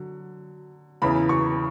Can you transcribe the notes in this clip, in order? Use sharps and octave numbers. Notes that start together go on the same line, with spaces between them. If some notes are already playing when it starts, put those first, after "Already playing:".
Already playing: D3 F#3
E2 C#3 E3 B5
C#6